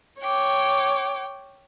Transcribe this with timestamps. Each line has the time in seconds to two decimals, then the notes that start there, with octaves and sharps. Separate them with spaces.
0.21 C#5 G5 D6